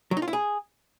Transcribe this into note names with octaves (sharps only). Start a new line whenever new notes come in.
F#3
D#4
F4
E4
G#4